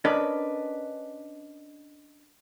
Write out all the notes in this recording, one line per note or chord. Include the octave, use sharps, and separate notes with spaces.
C#4 D4 A#4 B4 D5 D#5